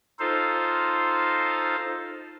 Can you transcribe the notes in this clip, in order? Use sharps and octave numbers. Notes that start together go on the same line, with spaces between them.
D#4 F4 A4 C5 F5